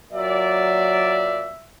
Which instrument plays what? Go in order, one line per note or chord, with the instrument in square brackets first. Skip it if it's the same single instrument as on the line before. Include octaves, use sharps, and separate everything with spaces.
[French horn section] A#2 D5 [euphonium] F#3 [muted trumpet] E5